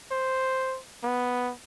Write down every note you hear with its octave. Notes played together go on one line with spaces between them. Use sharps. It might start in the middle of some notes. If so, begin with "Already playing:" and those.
C5
B3